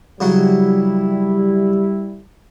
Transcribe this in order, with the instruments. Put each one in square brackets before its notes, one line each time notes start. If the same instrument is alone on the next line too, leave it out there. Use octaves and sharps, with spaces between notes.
[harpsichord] C#3 F#3 F#4 [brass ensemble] G3 E4